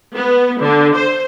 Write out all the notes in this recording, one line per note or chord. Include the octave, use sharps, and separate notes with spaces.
B3
D3
C5